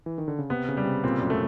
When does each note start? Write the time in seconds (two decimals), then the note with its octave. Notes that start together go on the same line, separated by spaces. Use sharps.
0.06 E3
0.18 D#3
0.28 D3
0.39 C#3
0.50 C3 B3
0.68 C#3
0.77 G3
0.85 C3
1.04 A#2 C4
1.22 F#2
1.30 A3